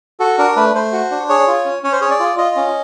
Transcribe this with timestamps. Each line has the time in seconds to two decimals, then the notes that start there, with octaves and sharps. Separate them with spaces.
0.20 F#4 A4
0.38 D4 A#4
0.56 A3 B4
0.75 A3 C5
0.92 F#4
1.11 D4
1.29 G#4 C#5
1.47 F4
1.65 C#4
1.83 C#4 C#5
1.92 C5
2.01 G#4 C#5
2.11 D5
2.20 F4
2.37 F4 D#5
2.56 C#4